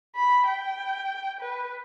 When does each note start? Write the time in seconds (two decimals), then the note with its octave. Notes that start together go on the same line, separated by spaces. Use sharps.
0.16 B5
0.47 G5
1.41 B4